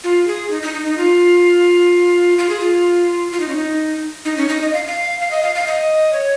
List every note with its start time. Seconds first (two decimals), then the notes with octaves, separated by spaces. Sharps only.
0.04 F4
0.27 G#4
0.50 D#4
0.62 D#4
0.74 D#4
0.85 D#4
0.97 F4
2.38 F4
2.49 G#4
2.60 F4
3.32 F4
3.40 D#4
3.49 C#4
3.56 D#4
4.25 D#4
4.37 C#4
4.49 D#4
4.61 D#5
4.73 F5
4.87 F5
5.20 F5
5.31 D#5
5.43 F5
5.55 F5
5.67 D#5
6.13 C#5